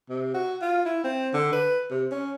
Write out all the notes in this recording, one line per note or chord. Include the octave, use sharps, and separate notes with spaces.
C3
F#4
F4
E4
C4
D3
B4
C3
C#4